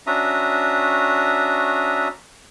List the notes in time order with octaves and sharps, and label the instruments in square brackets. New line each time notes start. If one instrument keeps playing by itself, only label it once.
[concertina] C#4 D4 F#4 E5 A#5 D#6